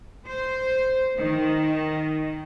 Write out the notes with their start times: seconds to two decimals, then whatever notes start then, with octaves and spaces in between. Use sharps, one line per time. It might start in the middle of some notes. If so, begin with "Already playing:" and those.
0.29 C5
1.17 D#3